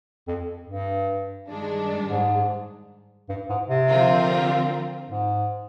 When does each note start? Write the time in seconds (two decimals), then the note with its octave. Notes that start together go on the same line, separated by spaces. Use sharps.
0.27 F2
0.67 G2
1.47 G2 D#3 G#3 D4
2.08 G#2
3.29 G2
3.49 G#2
3.69 C3
3.89 D3 F3 C4 F4 A#4
5.10 G#2